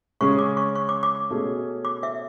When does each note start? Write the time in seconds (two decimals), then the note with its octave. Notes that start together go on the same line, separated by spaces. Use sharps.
0.21 C#3 G#3 C#4 G#4 C#6
0.39 D6
0.57 C#6
0.75 C#6
0.89 D6
1.03 D6
1.30 B2 A3 C#4 G#4
1.85 D6
2.03 E5